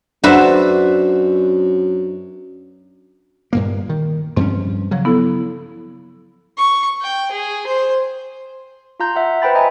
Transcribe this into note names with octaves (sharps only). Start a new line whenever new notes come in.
F#2 D4 F#4 B4 C5 E5
G2 A#2 A#3
D#3
G2 F3 C4 C#4
C#3 F3 F#3
B3 E4 A4
C#6
G5
G#4
C5
F4 F5 A#5 G6
E5 F#5
B4 C5 G5 B5 A6
B4 C5 D#5 E5 G#5 A#5